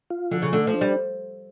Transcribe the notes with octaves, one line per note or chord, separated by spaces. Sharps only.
F4
D3 F3
C#3
D3 A3
F3
D4
G3